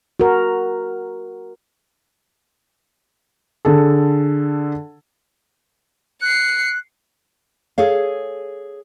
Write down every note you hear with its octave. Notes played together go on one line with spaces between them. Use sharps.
F#4 A#4
D3 G#4 A4
F#6 C7 C#7
G#4 A4 C#5 F5